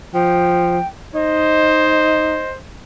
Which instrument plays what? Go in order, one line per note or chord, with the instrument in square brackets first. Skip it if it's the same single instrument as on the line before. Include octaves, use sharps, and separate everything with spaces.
[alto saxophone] F3 [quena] G5
[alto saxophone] D#4 [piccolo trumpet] C5 [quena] D#5